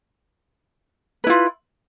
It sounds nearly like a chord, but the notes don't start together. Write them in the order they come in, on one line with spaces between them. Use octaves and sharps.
B4 E4 F4